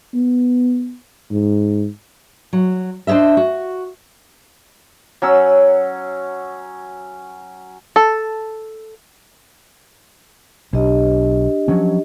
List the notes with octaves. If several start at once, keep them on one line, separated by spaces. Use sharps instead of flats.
B3
G#2
F#3
D4 C5 C#5 D#5 E5
F#4
F#3 C#4 E6
A4
B1 D4 G4 D#5
F3 F#3 C#4